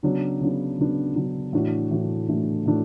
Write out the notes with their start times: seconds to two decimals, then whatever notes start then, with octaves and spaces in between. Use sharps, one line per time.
0.03 C#3 F#3 B3 D4
0.41 C#3 F#3 B3 D4
0.79 C#3 F#3 B3 D4
1.16 C#3 F#3 B3 D4
1.53 A2 E3 A3 D4 F#4
1.91 A2 E3 A3 D4 F#4
2.28 A2 E3 A3 D4 F#4
2.66 A2 E3 A3 D4 F#4